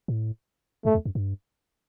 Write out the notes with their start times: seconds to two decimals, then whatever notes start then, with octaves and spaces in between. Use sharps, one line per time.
0.08 A2
0.85 G2 A3
0.94 E2
1.05 F#2
1.15 G2